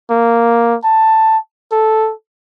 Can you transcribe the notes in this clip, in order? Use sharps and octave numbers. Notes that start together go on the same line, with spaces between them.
A#3
A5
A4